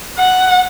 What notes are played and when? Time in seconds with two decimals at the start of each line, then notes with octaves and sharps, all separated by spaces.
0.19 F#5